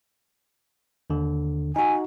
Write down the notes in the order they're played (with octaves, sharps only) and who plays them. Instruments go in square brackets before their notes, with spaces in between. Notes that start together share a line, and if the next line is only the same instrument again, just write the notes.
[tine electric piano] D#2 D3
[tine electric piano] D#4 F#4 [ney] G#5